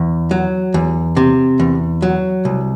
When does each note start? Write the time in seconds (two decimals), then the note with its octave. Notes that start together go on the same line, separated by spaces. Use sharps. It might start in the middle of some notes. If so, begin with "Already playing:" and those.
Already playing: E2
0.31 F#3
0.74 E2
1.17 C3
1.60 E2
2.02 F#3
2.45 C2